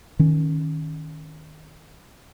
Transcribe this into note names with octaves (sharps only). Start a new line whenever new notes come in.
D#3 C#4